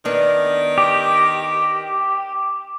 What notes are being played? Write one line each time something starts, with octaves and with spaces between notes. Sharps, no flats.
D#3 B3 D4
G4 D6